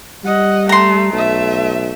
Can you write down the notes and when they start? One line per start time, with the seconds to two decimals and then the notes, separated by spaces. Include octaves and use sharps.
0.24 G3 D#5 F#5
0.69 A3 A#5 C6
1.13 B1 A3 E5